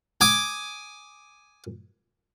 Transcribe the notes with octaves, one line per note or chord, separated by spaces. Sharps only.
G#5 D6 D#6